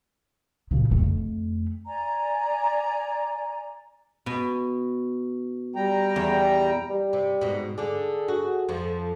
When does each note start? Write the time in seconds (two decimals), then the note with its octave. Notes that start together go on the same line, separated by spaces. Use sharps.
0.71 A#2 C#3
0.91 F2 A3
1.85 D5 G#5 A#5
4.26 B2
5.76 G3 G5 A#5
6.16 E2
6.90 G3
7.13 C3
7.41 G#2 B2
7.78 D3 D4 G#4
8.28 F#4
8.69 F2 F3